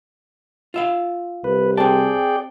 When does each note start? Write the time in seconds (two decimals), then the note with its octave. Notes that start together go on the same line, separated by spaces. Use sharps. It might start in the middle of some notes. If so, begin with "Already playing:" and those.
0.74 F4 E5 F5
1.44 C2 B4
1.77 C4 G#4 D5 G5 A5